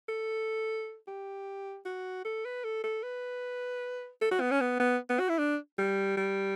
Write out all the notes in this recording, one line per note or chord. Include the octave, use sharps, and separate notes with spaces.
A4
G4
F#4
A4
B4
A4
A4
B4
A4
F#4
B3
C#4
B3
B3
B3
F#4
E4
D4
G3
G3